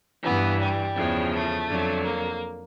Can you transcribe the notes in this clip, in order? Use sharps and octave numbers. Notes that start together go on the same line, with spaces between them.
G2 E3 B3
G3
E2 C#3 F3
A3
F2 D3 F#3
A#3